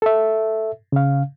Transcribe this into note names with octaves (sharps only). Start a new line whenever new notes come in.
A4 E5
C#3 F5